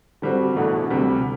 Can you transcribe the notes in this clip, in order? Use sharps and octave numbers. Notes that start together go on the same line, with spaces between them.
D3 G3 C4 F#4
E2 B2 A3 D4 F#4
D2 C3 G3